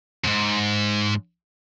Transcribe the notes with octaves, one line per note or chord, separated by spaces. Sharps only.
F2 G#2